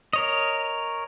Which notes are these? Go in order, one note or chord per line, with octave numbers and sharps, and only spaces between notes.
A#4 C#5 D#5